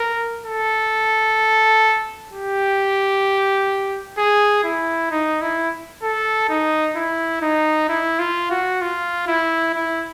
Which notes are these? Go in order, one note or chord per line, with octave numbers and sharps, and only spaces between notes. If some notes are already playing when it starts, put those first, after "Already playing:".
Already playing: A#4
A4
G4
G#4
E4
D#4
E4
A4
D#4
E4
D#4
E4
F4
F#4
F4
E4
E4